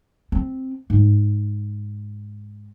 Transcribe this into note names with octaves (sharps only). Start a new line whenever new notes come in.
C4
G#2